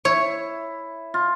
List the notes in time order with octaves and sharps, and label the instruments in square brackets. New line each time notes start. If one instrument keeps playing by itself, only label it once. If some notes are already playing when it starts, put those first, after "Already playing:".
[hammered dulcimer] E4 [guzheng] C#5
[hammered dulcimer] F4